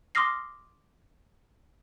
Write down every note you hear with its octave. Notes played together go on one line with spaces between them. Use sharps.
C6 D6 D#6 F6 A#6 C7